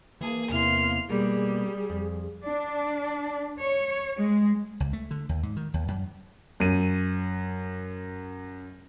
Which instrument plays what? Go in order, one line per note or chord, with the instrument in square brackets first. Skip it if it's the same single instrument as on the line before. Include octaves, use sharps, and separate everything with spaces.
[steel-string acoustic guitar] E3 A5 [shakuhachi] A#3 [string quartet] G#4
[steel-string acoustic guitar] E2 C3 E4 [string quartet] C6 F6
[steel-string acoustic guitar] B2 A#3 [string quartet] G3 [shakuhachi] G#4
[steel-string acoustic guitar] F2
[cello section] D4
C#5
G#3
[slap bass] C#2
A3
D3
D#2
G#2
D#3
D#2
F#2
[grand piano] F#2 D#7